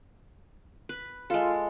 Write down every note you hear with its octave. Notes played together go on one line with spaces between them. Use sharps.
B4
G#3 F4 A4